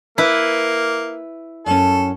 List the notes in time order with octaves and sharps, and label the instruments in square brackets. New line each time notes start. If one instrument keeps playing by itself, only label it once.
[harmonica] A#3 [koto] E4 B4
[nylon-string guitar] F#2 C#4 [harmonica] A4